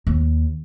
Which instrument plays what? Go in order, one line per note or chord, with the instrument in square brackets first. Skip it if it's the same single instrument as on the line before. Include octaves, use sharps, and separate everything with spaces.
[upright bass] D#2